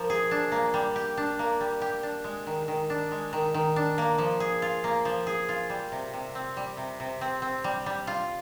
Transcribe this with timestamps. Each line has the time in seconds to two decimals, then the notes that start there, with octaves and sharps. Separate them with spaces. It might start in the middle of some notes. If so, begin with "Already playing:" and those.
Already playing: F3 A#3
0.10 G#4
0.31 D4
0.52 A#3
0.74 G3
0.96 G4
1.17 D4
1.39 A#3
1.61 G3
1.82 G4
2.03 D4
2.24 G#3
2.47 D#3
2.68 D#3
2.90 D4
3.12 G#3
3.33 D#3
3.54 D#3
3.76 D4
3.98 A#3
4.18 F3
4.40 G#4
4.62 F4
4.84 A#3
5.05 F3
5.27 G#4
5.49 F4
5.70 G3
5.92 C3
6.14 C3
6.35 C4
6.57 G3
6.77 C3
7.00 C3
7.21 C4
7.42 C4
7.64 G3
7.86 G3
8.07 F4